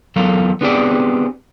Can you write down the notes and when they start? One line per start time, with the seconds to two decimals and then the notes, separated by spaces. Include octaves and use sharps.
0.16 E2 F#3 A4 A#4 F5
0.61 B3 C4 D4 G4 G#4 D5